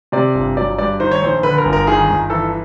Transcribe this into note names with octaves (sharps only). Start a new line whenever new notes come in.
C3 D5
G1
F#3 D5
G2 D5
D#3 C5
C#5
A#1 C5
D3 B4
A#4
G1
A#4
D#3 G#4
G1
E3 A4